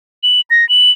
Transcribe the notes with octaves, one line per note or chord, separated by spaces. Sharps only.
F#7
A#6
F#7